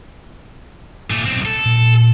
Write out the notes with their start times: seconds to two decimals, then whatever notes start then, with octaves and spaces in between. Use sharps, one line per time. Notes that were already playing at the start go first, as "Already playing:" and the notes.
1.10 A#2 A3
1.25 B1 C4
1.45 A4
1.65 A#2